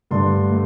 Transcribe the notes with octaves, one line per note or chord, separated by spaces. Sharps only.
G2 D3 A3 D4 C6
A3